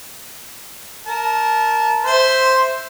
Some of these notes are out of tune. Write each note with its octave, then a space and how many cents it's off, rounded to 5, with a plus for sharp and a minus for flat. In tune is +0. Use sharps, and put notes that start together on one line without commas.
A#4 +0 A5 -20
C5 +0 E5 +0 C6 +0